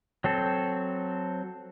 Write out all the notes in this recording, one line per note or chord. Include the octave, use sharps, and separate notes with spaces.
F#3 C4 A4